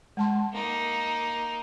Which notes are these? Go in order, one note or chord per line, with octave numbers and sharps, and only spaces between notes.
G#3 A5 C6
A#3 D#4